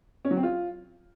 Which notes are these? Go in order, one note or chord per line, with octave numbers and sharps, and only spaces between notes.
C#4
F#3
C4
F4